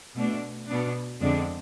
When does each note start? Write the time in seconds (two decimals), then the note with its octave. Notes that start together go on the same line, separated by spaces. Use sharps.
0.16 B2 A3 D4
0.68 B2 B3 D4
1.21 F2 D3 G#3 D4